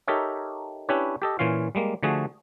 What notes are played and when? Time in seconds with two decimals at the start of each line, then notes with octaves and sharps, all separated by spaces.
0.08 D#4 G4 A4 A#4 C#5 E5
0.89 C#4 D4 E4 G4 B4 C#5
1.22 G4 A4 D#5
1.39 A#2 E3 C#4 F4 F5
1.75 G3 G#3 A#3
2.03 D3 F3 A3 F#4 G#4